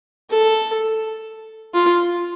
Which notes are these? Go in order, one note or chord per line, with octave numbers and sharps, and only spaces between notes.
A4
F4